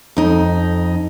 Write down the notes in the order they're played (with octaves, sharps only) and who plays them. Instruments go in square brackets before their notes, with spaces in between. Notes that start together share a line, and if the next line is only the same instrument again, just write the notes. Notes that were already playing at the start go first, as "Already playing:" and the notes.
[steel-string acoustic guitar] F2 D#4